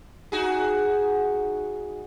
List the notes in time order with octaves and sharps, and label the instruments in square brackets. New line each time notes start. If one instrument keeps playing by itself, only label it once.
[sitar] D#4 F#4 G#4